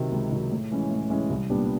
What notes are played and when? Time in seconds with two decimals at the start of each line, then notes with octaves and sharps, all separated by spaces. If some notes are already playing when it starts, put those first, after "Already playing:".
Already playing: C3 D#3 F#3
0.12 C#2
0.32 C3 D#3 F#3
0.51 A2
0.71 E3 G#3 C#4
0.91 A2
1.10 E3 G#3 C#4
1.30 C2
1.50 A#2 G3 B3 D4